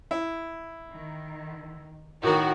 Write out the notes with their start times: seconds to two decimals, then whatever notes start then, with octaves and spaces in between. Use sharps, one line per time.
0.11 E4
0.91 D#3
2.23 A2 D#3 F#4 A#4